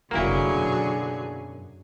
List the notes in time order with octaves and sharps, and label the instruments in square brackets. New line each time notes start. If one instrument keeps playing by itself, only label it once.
[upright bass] F1 C4 [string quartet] D3 F#3 G#4 [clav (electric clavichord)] A#3 E4
[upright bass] F#2 B2